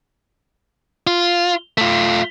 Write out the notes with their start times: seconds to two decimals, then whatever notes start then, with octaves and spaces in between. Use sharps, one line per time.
1.07 F4
1.78 A3 F4